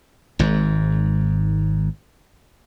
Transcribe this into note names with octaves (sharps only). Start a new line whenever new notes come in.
G#1 G#2